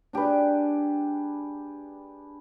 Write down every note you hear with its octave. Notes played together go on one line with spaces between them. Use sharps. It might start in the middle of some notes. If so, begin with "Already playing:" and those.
D4 G4 G#4 B4